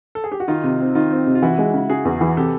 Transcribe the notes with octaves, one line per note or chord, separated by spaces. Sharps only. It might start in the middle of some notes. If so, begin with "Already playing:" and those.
A4
G#4
G4
F#4
D#3 D#4 F4
C3
C4
D#3 D#4 F4
C4
C3
F4
E3 E4 F#4
G#3
C#3
C#3 F#4 G#4
E2
E3
C3 G4 A4